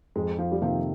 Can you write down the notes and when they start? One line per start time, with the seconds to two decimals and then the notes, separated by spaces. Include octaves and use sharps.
0.16 F2 G#3
0.39 F3
0.52 G3
0.62 C3 D#3 F3 A#3